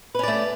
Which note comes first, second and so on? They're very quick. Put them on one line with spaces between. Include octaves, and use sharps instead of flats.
B4 C#4 D5 A3